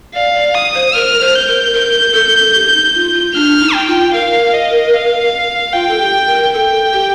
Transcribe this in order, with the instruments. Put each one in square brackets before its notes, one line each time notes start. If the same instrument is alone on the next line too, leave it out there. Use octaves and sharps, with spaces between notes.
[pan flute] D5 [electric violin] F5
[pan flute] D5
[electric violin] D#6
[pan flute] C5
[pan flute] A#4 [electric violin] F6
[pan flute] C5
[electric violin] G6
[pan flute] A#4
A#4
A4
G4
D#4
F4
F4
[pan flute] D4 [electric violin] F6
[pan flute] D#4
[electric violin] G5
[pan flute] F4
[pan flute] A#4 [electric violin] F5
[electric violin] D#5
F5
[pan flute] F4 [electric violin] G5
[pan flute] A4
G4
A#4
[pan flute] A4 [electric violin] G5
[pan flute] G4